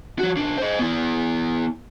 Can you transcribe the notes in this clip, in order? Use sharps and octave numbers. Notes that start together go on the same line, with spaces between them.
F3 F#4
B1 D4
C5 D#5
B3 E4